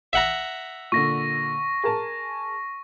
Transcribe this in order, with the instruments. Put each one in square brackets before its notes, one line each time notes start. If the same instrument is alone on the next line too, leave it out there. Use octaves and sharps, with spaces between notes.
[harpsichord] E5 F#5 A#5
[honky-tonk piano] A#2 D3 [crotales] C#6 A#6
[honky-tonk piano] G#4 A#4 A5